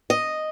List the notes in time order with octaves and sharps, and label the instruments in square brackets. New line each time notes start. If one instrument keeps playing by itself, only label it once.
[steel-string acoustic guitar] D#5